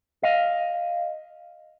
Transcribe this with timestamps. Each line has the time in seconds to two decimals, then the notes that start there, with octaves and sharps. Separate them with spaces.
0.23 D#5 F5